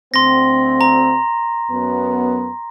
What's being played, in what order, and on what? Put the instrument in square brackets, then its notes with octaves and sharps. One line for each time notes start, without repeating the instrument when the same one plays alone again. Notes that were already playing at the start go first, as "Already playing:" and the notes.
[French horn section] D2 C4 [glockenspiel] C6 A#6
[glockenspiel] A#5
[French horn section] F#2 B3